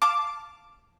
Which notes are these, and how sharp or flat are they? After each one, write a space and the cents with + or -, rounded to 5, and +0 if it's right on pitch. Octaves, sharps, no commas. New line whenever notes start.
F5 +0 A5 +0 D6 +0